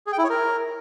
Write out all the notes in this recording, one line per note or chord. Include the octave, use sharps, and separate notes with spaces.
G#4
G5
E4
C#5
A#4